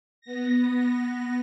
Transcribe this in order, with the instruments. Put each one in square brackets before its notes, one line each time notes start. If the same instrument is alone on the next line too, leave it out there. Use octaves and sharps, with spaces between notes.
[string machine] B3 A#6